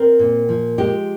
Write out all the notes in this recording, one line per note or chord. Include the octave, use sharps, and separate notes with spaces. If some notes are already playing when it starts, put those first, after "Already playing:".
Already playing: C4 A#4
A#2
F3
G#3 G4